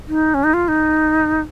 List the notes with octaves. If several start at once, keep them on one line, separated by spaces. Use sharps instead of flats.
D#4
C#4
D#4
F4
D#4